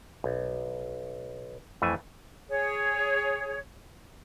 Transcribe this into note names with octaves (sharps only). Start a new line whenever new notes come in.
B1
F2 E3 A3 G#5
G#4 C#5